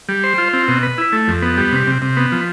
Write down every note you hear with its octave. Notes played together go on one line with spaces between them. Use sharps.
G3
C5
F4
C4
B2
B4
E4
A3
F2
B3
G3
C3
C3
C3
B3
F3